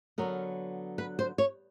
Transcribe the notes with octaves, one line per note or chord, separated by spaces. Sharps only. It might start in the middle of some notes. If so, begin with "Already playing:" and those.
D3 F#3 B3 A#4
B4
C5
C#5